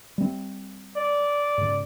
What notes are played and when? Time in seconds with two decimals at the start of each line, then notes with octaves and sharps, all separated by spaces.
0.18 G3 C4
0.96 D5
1.58 G#2 C#3